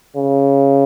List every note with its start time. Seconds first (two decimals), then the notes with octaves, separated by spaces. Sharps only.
0.16 C#3